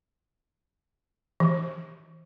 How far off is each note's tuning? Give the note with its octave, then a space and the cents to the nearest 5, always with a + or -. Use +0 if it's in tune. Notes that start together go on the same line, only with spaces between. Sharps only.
E3 -20